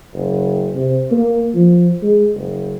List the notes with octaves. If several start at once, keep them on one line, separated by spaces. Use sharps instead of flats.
F#1
C3
A#3
F3
G#3
F#1